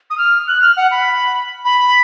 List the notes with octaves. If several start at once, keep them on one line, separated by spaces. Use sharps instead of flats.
D#6
F6
F#6
F6
F#5
B5
B5